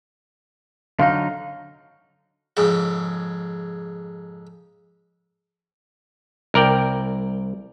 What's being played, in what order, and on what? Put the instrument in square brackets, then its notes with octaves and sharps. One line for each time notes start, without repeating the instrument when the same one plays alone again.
[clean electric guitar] D3 F#3 D#4 [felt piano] F5
[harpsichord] F2 G#2 C#3
[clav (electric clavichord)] C2 A#4 D5 G5